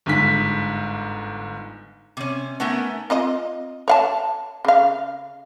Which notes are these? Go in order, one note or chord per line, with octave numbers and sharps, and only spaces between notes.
G1 G#2 B6
C3 C#4
A3 B3 C#4 D#4 A#4 E5
C4 F4 D#5
C#5 F5 A5
C#3 F5